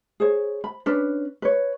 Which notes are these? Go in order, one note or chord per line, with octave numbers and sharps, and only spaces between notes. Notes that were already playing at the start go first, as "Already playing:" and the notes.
G#4 C5 C#5
B5
C#4 D4 B4
B4 C#5